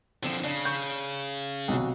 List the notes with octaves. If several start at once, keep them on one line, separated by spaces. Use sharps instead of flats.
D3 F3 C4 E7
C#3 D4
C#6 G6
B1 C3 F#4